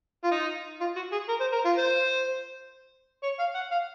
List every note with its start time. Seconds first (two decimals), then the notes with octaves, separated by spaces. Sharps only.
0.24 F4
0.32 D#4
0.80 F4
0.96 F#4
1.12 G#4
1.29 A#4
1.41 C5
1.53 A#4
1.65 F4
1.78 C5
3.23 C#5
3.39 F5
3.55 F#5
3.71 F5